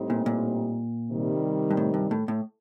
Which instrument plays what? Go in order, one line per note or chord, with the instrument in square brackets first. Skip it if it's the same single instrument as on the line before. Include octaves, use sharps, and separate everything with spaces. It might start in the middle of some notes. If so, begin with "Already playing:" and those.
Already playing: [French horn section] A2 G3 C4 D#4 G4
[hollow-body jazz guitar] A#2
A#2
[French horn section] C3 D#3 G3
[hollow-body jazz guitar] G2
A2
G2
A2
A2